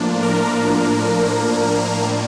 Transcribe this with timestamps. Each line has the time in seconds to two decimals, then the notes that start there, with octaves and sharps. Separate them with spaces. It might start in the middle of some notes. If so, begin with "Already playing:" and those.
Already playing: A2 F3 A#3 D4
0.22 A#4